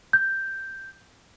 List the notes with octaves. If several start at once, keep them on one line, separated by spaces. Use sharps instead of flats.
G6